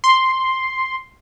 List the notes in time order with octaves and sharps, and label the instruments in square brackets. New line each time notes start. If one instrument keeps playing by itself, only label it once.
[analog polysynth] C6